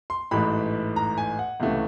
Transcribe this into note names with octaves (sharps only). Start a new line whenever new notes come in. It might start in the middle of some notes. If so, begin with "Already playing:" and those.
C6
A1 G#2 E3 A3 B5
A#5
G#5
F#5
C#2 C3 E3 A3 C#4